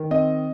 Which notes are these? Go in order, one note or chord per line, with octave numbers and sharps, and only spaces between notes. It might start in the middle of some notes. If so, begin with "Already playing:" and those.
Already playing: D#3
C4 D#5